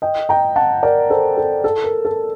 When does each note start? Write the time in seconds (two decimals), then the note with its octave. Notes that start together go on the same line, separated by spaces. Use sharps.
0.02 D#5 G5
0.29 G5 A#5
0.56 F#5 A5
0.83 A#4 D5
1.10 A4 C5
1.37 A4
1.64 A4
1.84 A#4
2.05 A4